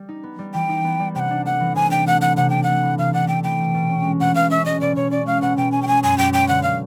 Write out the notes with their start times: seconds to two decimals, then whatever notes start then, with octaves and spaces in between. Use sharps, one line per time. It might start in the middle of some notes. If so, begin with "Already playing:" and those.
Already playing: G3
0.09 D#4
0.23 B3
0.39 G3
0.54 E3 G5
0.69 D#4
0.85 B3
1.00 G3
1.15 C3 G5
1.19 F#5
1.31 D4
1.45 A3 F#5
1.60 E3
1.75 C3 G#5
1.91 D4 G5
2.07 A3 F#5
2.21 E3 F#5
2.37 C3 F#5
2.50 D4 G5
2.63 A3 F#5
2.83 E3
2.98 C3 F5
3.14 D4 F#5
3.28 A3 G5
3.43 E3 G5
3.59 B2
3.74 B2
3.89 C#4
4.04 G#3
4.20 B2 F#5
4.35 B2 F5
4.50 C#4 E5
4.65 G#3 D#5
4.81 B2 D5
4.96 B2 C#5
5.11 C#4 D5
5.26 G#3 F5
5.42 B2 F#5
5.57 B2 G5
5.72 C#4 G#5
5.82 G5
5.87 G#3 G#5
6.03 F#2 G#5
6.18 F#2 G5
6.33 F#3 G5
6.48 D3 F#5
6.63 F5